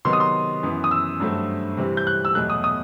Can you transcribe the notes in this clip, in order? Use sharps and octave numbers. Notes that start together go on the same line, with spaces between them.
C3 D#3 F#3 B3 C6
D#6
C6
F#2 E3 B3
D#6
E6
G2 F#3 A3 C4
C3 E3 G3 C4
G6
F#6
E6
E2 B2 F#3 A3 F#6
D#6
D#6